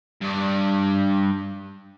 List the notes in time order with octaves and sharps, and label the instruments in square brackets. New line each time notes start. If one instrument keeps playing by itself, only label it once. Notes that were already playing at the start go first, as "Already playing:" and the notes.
[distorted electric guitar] G2 D5